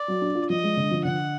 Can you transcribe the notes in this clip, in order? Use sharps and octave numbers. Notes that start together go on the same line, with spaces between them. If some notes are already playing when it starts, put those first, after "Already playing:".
Already playing: D5
F#3
D4
F4
F3 D#5
G#3
D3
F3
D3 F#5